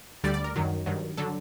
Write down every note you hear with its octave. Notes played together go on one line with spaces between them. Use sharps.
D2 D3 G3 D5
D5
A#4
F#2 D#3 F#3
G2 D#3 F#3
D3 F#3 A4